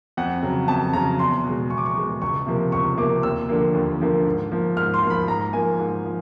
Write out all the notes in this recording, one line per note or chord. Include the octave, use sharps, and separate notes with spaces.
F2 F#5
C#3 F#3
F2 A5
C#3 F#3 A#5
E2 C6
B2
G#3
E2 C#6
D6
C#6
B2 G#3
C#2 C#6
C3 F3 A#3
C#2 C#6
C3 F3 A#3 D6
D#2 E6
D3 F3 A#3
D#2
D3 F3 A#3
G#2
F3 A#3
G#2 F6
C6
F3 A#3
B5
G#2 A#5
F3 A#3 G#5
G#2
F3